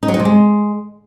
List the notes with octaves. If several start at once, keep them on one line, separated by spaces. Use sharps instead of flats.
D#4
F#3
D#4
C3
G#3